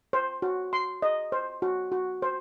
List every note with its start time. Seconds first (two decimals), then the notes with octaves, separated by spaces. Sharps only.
0.13 C5
0.42 F#4
0.73 C6
1.02 D#5
1.32 C5
1.62 F#4
1.92 F#4
2.22 C5